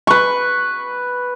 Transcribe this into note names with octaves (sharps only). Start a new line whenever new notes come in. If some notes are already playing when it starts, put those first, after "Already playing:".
B4 C#6